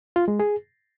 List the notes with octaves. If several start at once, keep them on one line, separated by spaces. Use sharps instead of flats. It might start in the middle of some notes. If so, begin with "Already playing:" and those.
F4
G#3
G#4